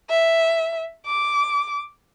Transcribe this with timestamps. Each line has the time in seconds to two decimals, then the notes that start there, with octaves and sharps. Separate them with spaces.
0.10 E5
1.06 D6